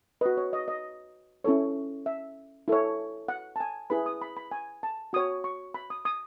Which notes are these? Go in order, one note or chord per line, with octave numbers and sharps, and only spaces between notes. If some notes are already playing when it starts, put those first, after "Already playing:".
F#4 B4 D#5
C#5
D#5
D#5
C#4 E4 A4 C#5
E5
E4 A4 C#5
F#5
A5
G#5
E4 G#4 B4 B5
D#6
B5
B5
G#5
A5
F#4 C#5 D#6
C#6
B5
D#6
D#6